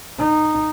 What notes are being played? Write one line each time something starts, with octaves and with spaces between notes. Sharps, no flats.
D#4